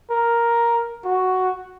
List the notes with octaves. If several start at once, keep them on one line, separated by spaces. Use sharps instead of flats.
A#4
F#4